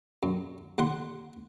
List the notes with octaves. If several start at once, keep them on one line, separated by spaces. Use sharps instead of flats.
F#2
D#2 F#5 C6